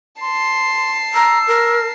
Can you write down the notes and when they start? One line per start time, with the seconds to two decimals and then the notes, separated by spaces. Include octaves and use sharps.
0.21 A5 C6 C7
1.14 A#5 E6
1.48 A#4